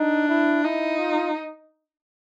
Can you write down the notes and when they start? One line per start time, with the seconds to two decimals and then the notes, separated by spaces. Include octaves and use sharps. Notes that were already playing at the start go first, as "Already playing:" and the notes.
Already playing: D4 D#4
0.29 E4
0.64 D#4 E4
0.99 F4